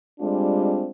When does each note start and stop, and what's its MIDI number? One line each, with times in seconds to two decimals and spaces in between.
0.20 0.90 55
0.20 0.90 56
0.20 0.90 60
0.20 0.90 62
0.20 0.90 65